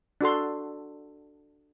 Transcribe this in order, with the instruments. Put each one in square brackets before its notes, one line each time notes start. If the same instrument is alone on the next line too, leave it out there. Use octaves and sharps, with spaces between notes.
[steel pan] D4 F#4 A4 C6